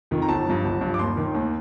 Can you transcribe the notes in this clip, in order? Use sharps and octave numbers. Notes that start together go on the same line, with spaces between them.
F2 D#3
A#5
G1 A5
G2 F3
G1
G2 F3
D6
D#2 C6
D#3
D#2